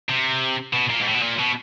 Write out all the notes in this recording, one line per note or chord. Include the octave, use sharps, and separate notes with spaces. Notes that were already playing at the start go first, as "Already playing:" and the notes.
C3
B2
A#2
G#2
A2
B2
A#2
B2